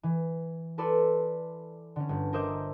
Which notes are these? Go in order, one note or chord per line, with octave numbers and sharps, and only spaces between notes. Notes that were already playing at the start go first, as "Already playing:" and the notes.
E3
E4 A4 B4 D5 C6 E6
D3 C#4
G1
A#4 C5 D#5 E5 D6 G6